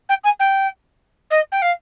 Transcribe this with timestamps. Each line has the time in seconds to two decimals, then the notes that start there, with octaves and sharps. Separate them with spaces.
0.09 G5
0.24 G#5
0.39 G5
1.30 D#5
1.52 G5
1.62 F5